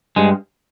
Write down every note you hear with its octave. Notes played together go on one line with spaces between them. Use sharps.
G2 G#3